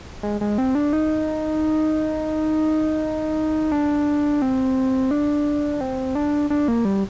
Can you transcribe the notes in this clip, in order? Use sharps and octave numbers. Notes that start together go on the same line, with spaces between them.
G#3
G#3
C4
D4
D#4
D4
C4
D4
C4
D4
D4
A#3
G3